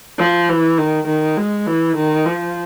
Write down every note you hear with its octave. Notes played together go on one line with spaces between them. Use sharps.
F3
E3
D#3
D#3
G#3
E3
D#3
F3